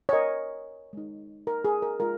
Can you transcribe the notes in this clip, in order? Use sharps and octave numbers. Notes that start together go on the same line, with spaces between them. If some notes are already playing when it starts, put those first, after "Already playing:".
C#5
A#4 D#5
G#3 D#4
A#4
G#4
A#4
G#3 F4 A#4